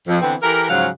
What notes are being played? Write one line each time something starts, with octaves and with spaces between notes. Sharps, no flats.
F2
D3 E3 B3 C4
E3 G4 A4 A#4
G#2 C#3 F3 F#3 F5 F#5